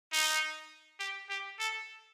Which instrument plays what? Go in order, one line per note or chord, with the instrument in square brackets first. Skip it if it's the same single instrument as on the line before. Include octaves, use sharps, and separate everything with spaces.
[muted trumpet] D#4
G4
G4
A4